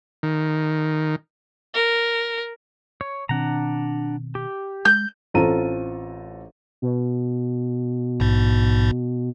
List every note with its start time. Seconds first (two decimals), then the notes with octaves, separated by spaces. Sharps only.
0.23 D#3
1.74 A#4
3.01 C#5
3.29 B2 D#3 C4 D4 F#5 A#5
4.35 G4
4.85 G#3 G6
5.34 A1 C4 F4 A4 A#5 D#7
6.82 B2
8.20 A#1 G#2